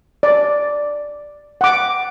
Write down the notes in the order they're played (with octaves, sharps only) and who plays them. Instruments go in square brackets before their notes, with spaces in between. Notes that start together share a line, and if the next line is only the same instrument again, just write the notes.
[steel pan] D5
F#5 D6